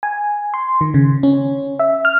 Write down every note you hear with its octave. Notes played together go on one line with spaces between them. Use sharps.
G#5
C6
D#3
C#3
C#4
E5
F6